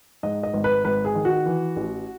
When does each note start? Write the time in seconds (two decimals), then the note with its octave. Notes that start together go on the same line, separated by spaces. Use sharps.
0.23 G#2 D#5
0.43 D#5
0.54 G#1
0.64 B4
0.84 G#1 B4
1.05 G#4
1.15 D#3
1.25 F#4
1.46 E3
1.76 A1